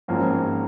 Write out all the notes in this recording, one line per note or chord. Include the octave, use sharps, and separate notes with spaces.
G#1 G#2 F3 A#3 C#4